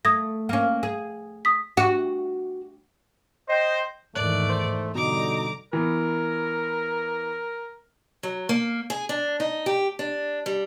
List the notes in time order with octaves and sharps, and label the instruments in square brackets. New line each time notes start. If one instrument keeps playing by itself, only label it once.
[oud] A3 [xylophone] D#6 G#6 A#6
[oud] A#3 C#4
G#4
[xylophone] D#6 B6
[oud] F#4
[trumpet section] C5 [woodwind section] D#5 G5
[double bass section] E2 G#2 D#3 [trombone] A3 [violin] D5 [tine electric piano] F#6
[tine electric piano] C5
[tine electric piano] B2 [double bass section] D3 G3 [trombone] D#4 [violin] A#5 D6
[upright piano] E3 B3 [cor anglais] A#4
[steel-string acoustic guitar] F#3
A#3
G#4
D4
D#4
G4
D4
G3